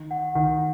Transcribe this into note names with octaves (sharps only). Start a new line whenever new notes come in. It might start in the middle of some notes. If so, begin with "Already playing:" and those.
Already playing: D#3
F#5
D#3 F#5